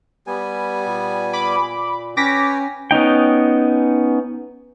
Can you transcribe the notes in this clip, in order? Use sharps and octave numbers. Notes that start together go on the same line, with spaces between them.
G3 B3 G4 G#5
A#2
B5 D6
C#4 B4 C#5 G5 D6 A#6 B6
B3 C#4 D#4 G5